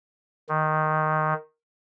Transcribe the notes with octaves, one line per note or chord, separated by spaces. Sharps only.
D#3